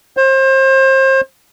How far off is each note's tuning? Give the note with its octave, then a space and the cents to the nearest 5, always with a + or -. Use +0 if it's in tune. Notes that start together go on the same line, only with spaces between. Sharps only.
C5 +30